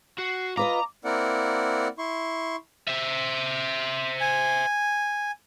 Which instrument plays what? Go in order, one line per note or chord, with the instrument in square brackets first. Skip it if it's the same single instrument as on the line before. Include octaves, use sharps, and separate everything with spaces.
[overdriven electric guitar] F#4 [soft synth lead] C7
[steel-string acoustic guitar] F4 B4 D#5 [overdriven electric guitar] A#5 [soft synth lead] D6
[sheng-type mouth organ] A#3 C4 E4 A#4 D5 F#5
E4 C6 C#6
[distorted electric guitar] C5 E5
[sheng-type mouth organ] G#5